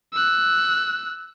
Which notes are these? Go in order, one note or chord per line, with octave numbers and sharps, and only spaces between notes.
E6 F#6